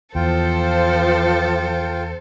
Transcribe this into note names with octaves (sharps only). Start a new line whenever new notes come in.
E2 F3 F4 A4 C5 G5